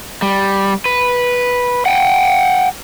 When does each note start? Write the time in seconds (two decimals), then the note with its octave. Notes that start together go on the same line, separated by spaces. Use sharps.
0.22 G3
0.85 B4
1.86 F#5 G5